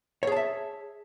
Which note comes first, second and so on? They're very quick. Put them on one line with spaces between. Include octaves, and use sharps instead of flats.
C#5 G#4 A5 E5